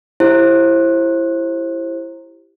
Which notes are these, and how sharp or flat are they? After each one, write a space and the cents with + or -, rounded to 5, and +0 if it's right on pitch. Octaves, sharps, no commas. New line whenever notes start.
E4 +20 G4 +0 C5 +30